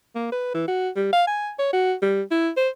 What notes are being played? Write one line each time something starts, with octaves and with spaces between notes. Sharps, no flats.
A#3
B4
E3
F#4
G3
F5
G#5
C#5
F#4
G3
E4
C5